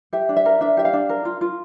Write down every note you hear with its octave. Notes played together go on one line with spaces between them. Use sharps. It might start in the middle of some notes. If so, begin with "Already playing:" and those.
G4 E5
D4
E5
A#4
D4 E5
G4 E5
F5
D4
A#4
F4
F4